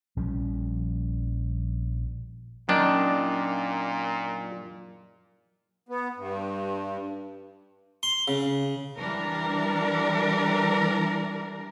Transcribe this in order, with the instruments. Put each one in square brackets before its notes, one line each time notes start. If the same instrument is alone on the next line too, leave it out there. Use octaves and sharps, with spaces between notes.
[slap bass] A#1 F3 G3 C#4
[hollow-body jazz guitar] F#2 [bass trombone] A#2 [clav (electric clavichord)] D#3 D4
[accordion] B3
G2
[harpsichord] C6
C#3
[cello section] E3 G3 D4 A#4